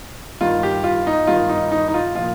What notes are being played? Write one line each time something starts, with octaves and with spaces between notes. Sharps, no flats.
G2 D#3 F4
G4
F4
D#4
G2 D#3 F4
D#4
D#4
D#4
F4
A#2 F3 F4